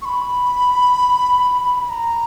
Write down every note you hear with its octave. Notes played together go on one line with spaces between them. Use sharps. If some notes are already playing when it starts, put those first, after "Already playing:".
C#6
B5
B5
A#5